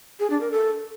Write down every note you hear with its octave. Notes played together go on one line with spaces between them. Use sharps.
G#4
D4
A#4
A4